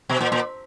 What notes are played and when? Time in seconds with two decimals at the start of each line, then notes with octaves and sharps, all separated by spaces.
0.09 B2
0.21 A#2
0.32 A#2